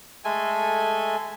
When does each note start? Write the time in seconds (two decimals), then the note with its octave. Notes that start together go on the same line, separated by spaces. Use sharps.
0.25 G#3 A3 A4 G#5